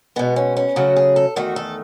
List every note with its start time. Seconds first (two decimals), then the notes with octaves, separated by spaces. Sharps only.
0.16 B2 G#3 B3
0.36 C#4
0.57 C#4
0.76 F#2 C#3 F#3 A3 F#4
0.96 G#4
1.16 A4
1.36 E2 D#3 A3 F#4
1.56 A4